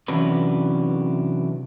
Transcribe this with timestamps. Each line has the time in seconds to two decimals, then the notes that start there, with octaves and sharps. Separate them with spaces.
0.08 C3 E3 F#3 C#4 D4 B4